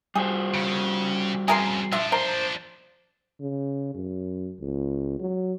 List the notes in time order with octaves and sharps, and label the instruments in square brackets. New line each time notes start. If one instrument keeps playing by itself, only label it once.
[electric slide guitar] G3 F#4 C5 [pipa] G#4
[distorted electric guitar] C#3
[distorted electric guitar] F2 C#3 [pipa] G#4 A#4 C6
[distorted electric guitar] F3 D4 [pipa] F4 E5
[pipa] A#4 [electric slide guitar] C5
[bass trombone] C#3
F#2
C#2
F#3